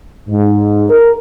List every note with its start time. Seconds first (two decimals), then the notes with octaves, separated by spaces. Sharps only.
0.28 G#2
0.90 A#4